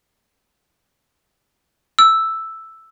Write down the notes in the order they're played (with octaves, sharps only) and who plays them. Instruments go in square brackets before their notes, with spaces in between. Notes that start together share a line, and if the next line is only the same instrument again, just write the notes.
[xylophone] E6